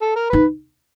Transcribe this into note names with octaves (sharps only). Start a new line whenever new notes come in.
A4
A#4
D#4 B4